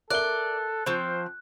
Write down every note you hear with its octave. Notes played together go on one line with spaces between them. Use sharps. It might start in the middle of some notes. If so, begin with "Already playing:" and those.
A4 A#4 D5 E5 F#6 G7
F3 C4 C5 C#6